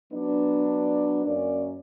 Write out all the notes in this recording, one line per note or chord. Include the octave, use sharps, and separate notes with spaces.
F#3 B3 D4
F#2 A#3 C#4 D5